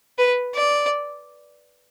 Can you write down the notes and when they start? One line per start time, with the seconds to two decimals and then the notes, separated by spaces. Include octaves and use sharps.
0.18 B4
0.55 D5